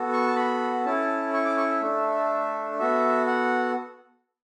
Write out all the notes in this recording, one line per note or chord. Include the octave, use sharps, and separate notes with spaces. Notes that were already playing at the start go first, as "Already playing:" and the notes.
Already playing: B3 F#4 A4
C#6
A5
B5
C#4 E4 A4 A5
C#6
D6
C#6
E5
A3 D4 A4
B3 F#4 A4 E5
F#5